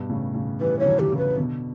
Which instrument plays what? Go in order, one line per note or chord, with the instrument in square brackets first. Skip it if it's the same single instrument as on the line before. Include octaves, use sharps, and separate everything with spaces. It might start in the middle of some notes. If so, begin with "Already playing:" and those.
Already playing: [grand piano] G2 B2
A2 C#3
A2 C#3
[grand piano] E3 G3 [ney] B4
[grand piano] E3 [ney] C#5
[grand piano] D3 F#3
[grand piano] D3 [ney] G4
[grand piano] C#3 E3
[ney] B4
[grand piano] B2 D3